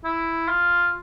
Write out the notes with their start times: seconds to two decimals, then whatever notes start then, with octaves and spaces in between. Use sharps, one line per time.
0.05 E4
0.48 F4